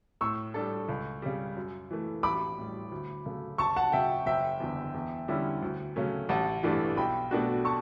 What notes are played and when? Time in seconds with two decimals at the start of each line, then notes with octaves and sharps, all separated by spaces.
0.21 A2 C#6 E6
0.54 G3 D4 A4
0.89 C#2
1.22 C#3 G3
1.57 F#2
1.91 E3 A3
2.23 A1 B5 D6
2.58 A2 G3
2.91 D2
3.26 C#3 F#3 A3
3.58 F#1 A5 C#6
3.76 F#5 A5
3.92 F#2 C#3 E5 G5
4.26 F#1 E5 G5
4.60 E2 D3
4.94 E2
5.28 D3 G3 C#4 E4
5.62 D2
5.96 C#3 F#3 A3 C#4
6.29 A1 F#5 A5
6.63 G2 E3 A3 D4
6.97 B1 G5 B5
7.31 B2 A3 D4 F#4
7.65 A5 C#6